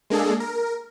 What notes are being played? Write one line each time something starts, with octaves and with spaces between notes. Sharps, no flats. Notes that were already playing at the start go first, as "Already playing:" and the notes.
G#3 A#3 D4 G#4 A4
A#4